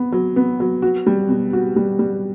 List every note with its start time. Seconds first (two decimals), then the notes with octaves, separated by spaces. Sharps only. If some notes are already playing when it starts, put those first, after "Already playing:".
Already playing: B3
0.12 F#3
0.36 B3
0.60 F#3
0.82 F#4
1.07 G3
1.29 B2
1.53 F#4
1.76 G3
1.99 G3